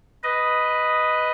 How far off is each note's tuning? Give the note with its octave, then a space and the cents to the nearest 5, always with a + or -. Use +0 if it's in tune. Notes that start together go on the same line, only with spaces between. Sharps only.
B4 +0 D#5 +0